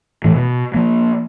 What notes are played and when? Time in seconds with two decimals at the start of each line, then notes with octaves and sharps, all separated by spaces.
0.24 A2 E3
0.36 B2
0.74 F3 A#3